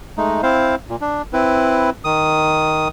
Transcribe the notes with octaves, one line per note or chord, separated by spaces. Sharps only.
G#3 A3 D#4
C4 E4 C5 F5
A#2
D4
C4 E4 B4
D#3 D#6